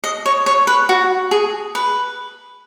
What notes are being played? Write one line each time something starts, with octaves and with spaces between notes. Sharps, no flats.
D#5
C#5
C#5
B4
F#4
G#4
B4